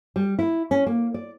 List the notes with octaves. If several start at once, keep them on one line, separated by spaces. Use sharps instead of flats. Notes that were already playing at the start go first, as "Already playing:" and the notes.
G3
E4
C#4
A#3
D5